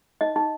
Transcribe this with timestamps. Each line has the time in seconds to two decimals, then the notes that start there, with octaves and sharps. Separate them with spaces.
0.21 D#4 D#5
0.36 D#4